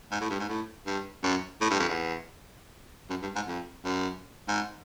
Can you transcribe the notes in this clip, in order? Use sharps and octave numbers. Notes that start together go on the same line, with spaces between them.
G#2
A2
G2
G#2
A2
G2
F#2
A2
G2
F2
E2
F#2
G2
G#2
F2
F#2
G#2